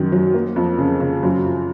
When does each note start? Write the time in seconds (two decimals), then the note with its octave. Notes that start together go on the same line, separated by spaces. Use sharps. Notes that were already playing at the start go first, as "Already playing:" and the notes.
Already playing: F#2 D#3
0.12 F#3
0.34 A#3
0.56 F2
0.78 C#3
1.00 C#3
1.23 F#2
1.45 F3